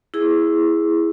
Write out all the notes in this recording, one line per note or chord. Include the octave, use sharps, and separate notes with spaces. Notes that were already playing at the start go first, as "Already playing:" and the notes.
E4 G#4